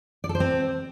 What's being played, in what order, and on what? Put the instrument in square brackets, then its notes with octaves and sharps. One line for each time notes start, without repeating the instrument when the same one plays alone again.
[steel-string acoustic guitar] D5
A4
C5
C4